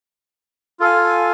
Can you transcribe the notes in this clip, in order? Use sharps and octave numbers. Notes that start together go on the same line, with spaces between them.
F4 A4 F5 G#5